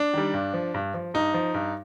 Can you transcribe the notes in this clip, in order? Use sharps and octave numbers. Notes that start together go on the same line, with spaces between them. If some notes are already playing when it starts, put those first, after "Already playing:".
Already playing: D4
D#3 G3
G2
F3
G2
F3
G2 D#4
F3
G2